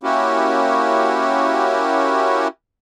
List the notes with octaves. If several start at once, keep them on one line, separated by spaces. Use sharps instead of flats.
A#3 C#4 E4 F#4 G4